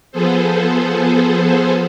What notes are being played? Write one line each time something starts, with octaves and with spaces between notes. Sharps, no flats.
F3 B3 G#4 A4 C5